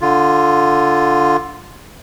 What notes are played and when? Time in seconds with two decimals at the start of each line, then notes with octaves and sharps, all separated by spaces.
0.01 D3 F4